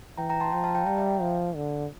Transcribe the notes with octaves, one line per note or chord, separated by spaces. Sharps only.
E3 G5 A#5
G5 A#5
A5 C6
F3 G5 A#5
F5 A5
G5 A#5
G3 G5 A#5
E5 G5
F3
D3